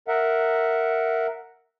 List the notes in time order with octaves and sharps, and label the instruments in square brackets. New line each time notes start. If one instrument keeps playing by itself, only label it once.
[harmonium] A#4 E5 F#5